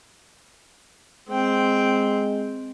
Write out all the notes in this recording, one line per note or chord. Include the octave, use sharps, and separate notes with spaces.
G#3 C4 G5